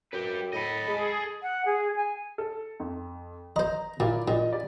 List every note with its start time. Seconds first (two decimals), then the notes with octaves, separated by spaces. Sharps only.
0.12 F#2 G4 B4
0.53 A2 A4 D#5 B5
0.88 G#3 G#4
1.43 F#5
1.65 G#4
1.96 G#5
2.38 A4
2.80 F2
3.56 C5 D#5 A#5
4.00 A#2 E4 F4 D5
4.28 A#2 F3 D#5
4.53 G4 D5